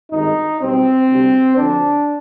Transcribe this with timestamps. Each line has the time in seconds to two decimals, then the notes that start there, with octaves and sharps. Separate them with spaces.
0.12 G#1 G2 D#3 G#3 D#4
0.60 B1 B2 G3 C4
1.08 D2 C3 G3
1.56 D2 D3 F3 D4